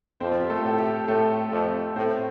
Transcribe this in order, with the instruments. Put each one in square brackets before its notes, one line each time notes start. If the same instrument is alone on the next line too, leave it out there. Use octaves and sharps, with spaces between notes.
[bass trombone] F2 [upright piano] C4 C5
[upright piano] F4
G4
A3 A4
[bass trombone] A2
[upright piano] G4
[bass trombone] A2 [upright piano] A3 A4
[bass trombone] F2
[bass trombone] A2 [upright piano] C4 C5